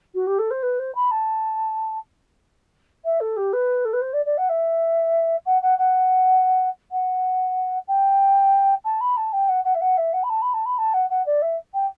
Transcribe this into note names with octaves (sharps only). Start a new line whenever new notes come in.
F#4
G4
A4
C5
B4
C5
B5
A5
E5
A4
G4
B4
A4
B4
C5
D5
D5
F#5
E5
F#5
F#5
F#5
F#5
G5
A5
B5
A5
G5
F#5
F#5
E5
F#5
E5
F#5
B5
A5
B5
A5
B5
A5
F#5
F#5
D5
E5
G5